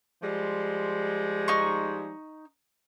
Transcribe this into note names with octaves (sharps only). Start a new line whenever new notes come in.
F3 G3 G#3
D#4 C#6